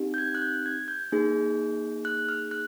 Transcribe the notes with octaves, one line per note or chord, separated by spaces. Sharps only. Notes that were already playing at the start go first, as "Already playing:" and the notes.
Already playing: C4 D#4 G4
G6
G#6
F#6
G6
G#6
G6
A#3 D#4 G#4
F#6
F6
F#6